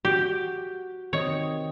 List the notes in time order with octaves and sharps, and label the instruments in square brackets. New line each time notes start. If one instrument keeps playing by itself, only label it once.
[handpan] F#4 [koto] G4
[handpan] D#3 C4 D#5 [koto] C#5